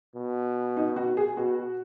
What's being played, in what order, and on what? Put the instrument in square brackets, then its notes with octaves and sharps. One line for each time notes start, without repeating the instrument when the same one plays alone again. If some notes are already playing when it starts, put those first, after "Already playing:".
[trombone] B2
[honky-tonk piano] D#4
F#4
G#4
[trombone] B2 [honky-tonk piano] F#4